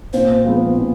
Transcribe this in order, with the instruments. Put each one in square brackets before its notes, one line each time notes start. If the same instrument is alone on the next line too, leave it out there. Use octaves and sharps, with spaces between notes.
[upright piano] A#2 [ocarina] C5
[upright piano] F3 G#3 B3
A#2